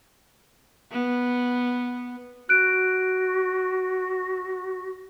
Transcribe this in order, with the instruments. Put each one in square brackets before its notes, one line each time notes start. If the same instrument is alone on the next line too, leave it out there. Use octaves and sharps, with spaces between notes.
[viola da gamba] B3
[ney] F#4 [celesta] F#6 D7